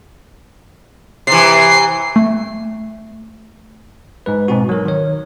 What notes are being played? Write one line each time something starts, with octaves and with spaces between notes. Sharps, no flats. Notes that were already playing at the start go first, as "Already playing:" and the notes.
C3 E3 C7
A3
G#2 G#3 B4
G#2 B2 C4 F#4
F#3 A#4
D#3 C#5